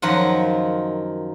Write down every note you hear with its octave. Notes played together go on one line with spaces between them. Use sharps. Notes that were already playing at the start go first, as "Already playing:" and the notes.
F#2 D#3 F3 F4 F#5